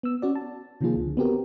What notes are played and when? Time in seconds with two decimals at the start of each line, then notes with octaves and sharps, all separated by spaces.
0.03 B3 E6
0.22 C#4 F#4 D5
0.35 A5
0.81 C3 D#3 F3 A#3 F4 G#4
0.96 C#2 D3
1.17 B3 C4 F#4 G4 A#4